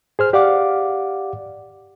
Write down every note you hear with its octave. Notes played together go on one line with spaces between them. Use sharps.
G#4 C5 F6
G4 D5 F5 F#5 D6